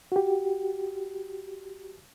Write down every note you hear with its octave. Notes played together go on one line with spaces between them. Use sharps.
F#4 G4